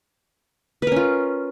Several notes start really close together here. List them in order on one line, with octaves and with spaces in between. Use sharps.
B4 A#4 C#4 F4